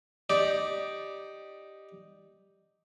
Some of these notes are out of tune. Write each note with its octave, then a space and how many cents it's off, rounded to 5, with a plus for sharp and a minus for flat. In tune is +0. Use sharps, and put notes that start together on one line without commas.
D#4 +0 G4 +0 D5 +0